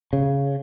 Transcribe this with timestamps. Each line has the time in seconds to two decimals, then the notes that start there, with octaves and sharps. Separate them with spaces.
0.13 C#3